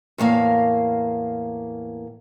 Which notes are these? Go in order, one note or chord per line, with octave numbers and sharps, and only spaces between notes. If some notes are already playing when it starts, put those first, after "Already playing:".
E2 A2 A#3 F5